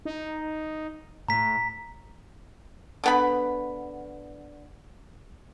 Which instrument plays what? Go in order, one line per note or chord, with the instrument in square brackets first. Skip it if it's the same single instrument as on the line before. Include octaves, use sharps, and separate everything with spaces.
[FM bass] D#4
[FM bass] A2 [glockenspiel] A#5 B6
[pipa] D3 B3 B5